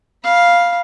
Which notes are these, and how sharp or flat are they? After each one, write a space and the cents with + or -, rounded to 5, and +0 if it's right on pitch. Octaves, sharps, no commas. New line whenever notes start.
F5 +0 B5 -30